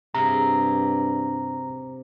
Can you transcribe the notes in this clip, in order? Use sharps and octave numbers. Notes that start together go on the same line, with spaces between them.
G2 C3 F4 G#4 A#5